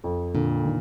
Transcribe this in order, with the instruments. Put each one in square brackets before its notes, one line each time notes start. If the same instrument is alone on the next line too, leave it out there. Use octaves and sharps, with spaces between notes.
[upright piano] F2
[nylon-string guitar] A#2 [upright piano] D3
[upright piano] D#3